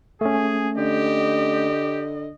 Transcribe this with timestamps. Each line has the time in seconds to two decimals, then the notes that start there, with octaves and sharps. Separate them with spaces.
0.21 A3 C#4 G#4
0.78 D3 G4 D#5